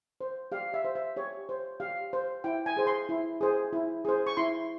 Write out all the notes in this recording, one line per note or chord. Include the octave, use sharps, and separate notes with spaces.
C5
G4 F5
E5
C5
E5
G4 C#5
C5
G4 F5
C5
E4 G5
G#5
G#4 C5
C6
E4
G#4 C5
E4
G#4 C5
C#6
E4 C6